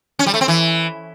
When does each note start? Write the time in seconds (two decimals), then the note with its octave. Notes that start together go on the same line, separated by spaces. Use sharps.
0.19 C#4
0.26 G3
0.34 A3
0.41 C4
0.48 E3